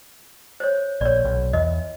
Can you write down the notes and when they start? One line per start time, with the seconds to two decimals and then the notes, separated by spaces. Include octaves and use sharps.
0.60 C5 C#5
1.01 A#1 C#5 D5
1.24 B1
1.53 E2 D#5